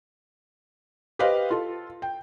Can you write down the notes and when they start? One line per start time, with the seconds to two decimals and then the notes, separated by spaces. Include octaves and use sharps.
1.19 G4 B4 C5 D#5 F5
1.51 F4 A4
2.02 G5